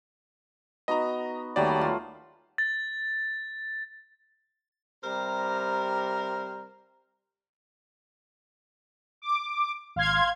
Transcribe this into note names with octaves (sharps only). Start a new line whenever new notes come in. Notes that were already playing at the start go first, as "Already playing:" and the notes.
B3 D#4 F#4 D#5 A#5
D#2 F#3 G3 A3 D5
F4 A4
A6
C3 G3 A#4 C5 A#5
D6
G#1 F5 C6 G#6